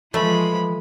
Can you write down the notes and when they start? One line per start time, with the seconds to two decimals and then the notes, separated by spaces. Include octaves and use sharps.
0.14 E3 F3 G#3 A3 B5